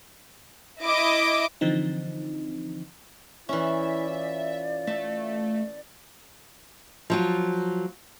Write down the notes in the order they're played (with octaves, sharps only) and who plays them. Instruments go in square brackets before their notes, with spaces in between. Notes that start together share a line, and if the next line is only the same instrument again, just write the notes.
[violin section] E4 D#5 D6
[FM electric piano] D3 E3 F3 C4 D#4
[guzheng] E3 C#4 [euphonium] E4 [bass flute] D5 [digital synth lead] E5
[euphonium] F4
[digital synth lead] A3 [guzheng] E5 A5
[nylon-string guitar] F3 F#3 F4